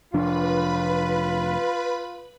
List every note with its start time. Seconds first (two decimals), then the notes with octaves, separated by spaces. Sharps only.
0.14 F1 F3 D4 F4 B4 B5